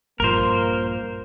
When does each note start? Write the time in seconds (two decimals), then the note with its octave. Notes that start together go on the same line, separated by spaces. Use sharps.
0.20 A#1 G2 F3 A#3 A#4 C5